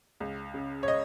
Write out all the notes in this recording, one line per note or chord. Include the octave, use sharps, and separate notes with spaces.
C#2
C#3
C#5
D#5